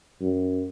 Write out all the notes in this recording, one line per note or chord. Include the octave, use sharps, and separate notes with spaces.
F#2